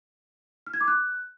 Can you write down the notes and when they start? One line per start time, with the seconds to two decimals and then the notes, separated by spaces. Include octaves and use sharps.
0.67 F6
0.74 G#6
0.81 D6
0.88 F#6